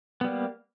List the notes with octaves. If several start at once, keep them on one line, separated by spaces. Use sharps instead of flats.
G3 A#3 B3